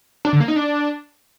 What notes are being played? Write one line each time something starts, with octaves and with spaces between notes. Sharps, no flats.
D4
D3
A#3
D#4
D4